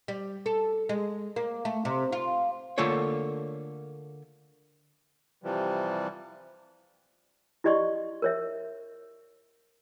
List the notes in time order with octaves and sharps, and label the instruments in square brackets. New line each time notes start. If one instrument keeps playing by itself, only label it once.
[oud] G3
A4
G#3
A#3
A3
C3
F4
[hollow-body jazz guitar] D3 A3 A#3 F4 A4 C#5
[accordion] C3 E3 F3 G3
[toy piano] E4 G4 D5 D#5 C6 C#6
A#4 C#5 E5